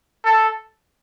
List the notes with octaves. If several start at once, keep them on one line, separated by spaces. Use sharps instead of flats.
A4